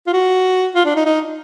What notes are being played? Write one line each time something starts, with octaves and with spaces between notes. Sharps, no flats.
F4
F#4
F4
D4
D#4
D#4